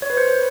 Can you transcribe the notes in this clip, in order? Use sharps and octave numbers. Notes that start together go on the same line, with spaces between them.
C#5
B4
C5